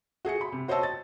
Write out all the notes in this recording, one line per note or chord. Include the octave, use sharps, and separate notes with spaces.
F#4 G#4 G#5 C#7
B5
C3
F#4 C5 C#5 D#5 A5 E6
A6